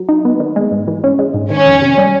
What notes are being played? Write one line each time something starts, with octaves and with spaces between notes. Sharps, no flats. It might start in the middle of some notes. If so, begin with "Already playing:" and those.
Already playing: F#3
D#4
B3
D#3
G#3
G#2
E3
C#4
G#3
G#2
D#3 C#4
F2
C3
G3